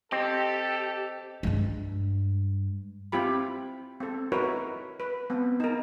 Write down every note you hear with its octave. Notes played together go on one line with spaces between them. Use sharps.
C4 G4 A4 D#5
G2 G#3
C4 E4 F4 G4 B5
C4 A4
D#4 E4 F#4 A#4 B4 C#5
B4
B3 C4
D#4 A#4